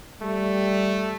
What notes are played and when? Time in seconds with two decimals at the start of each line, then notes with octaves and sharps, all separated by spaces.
0.22 G3 A3